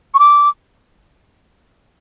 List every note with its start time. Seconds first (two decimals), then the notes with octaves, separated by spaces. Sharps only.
0.14 C#6
0.19 D6